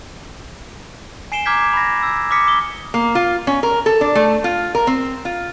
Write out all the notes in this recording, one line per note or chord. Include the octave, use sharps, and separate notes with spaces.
G#5 C7 D7 E7 G7
A#5 D6 F6 G6 G#6 B6
B5 A#6
E6 G#6
D6 D#6 F6 B6 C#7
D6 D#6 G7
A#3
F4
C#4
A#4
A4
D4
A3
F4
A#4
C4
F4